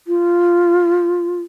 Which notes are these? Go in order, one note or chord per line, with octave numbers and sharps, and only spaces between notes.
F4